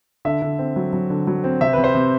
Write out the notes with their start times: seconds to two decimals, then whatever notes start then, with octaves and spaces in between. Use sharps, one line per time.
0.25 D3 E5
0.42 D3
0.59 C4
0.76 F#3
0.93 F#3
1.10 D3
1.27 F#3
1.44 C4
1.61 C3 E5
1.73 C3 B4
1.84 C5
1.95 C3